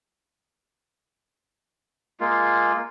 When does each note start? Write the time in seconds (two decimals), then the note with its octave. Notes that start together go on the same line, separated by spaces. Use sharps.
2.20 G#3 A#3 F4